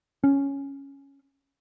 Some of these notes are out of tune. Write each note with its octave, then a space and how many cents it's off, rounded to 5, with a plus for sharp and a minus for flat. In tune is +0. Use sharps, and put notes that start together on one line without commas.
C#4 +0